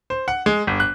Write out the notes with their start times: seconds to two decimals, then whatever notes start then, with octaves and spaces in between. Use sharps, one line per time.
0.10 C5
0.28 F#5
0.46 G#3
0.67 G1
0.80 F#6